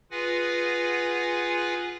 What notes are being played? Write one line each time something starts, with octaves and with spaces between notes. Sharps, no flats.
F4 G#4 B4 F#5 G#5 A#6